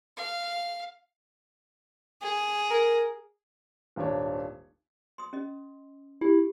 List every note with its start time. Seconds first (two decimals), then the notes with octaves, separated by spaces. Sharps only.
0.17 F5
2.22 G#4
2.71 A#4
3.96 D#1 G#1 D4 C#5
5.18 C6 D#6
5.33 C#4 D#5
6.21 E4 G4